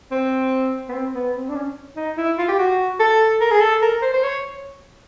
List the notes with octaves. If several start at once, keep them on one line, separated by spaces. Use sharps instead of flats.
C4
B3
C4
B3
C4
D4
C#4
D#4
E4
F4
G4
F#4
A4
A#4
G#4
A4
A#4
C5
C5
C#5